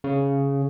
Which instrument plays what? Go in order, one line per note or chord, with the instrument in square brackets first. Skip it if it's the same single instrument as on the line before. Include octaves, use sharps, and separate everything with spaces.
[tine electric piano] C#3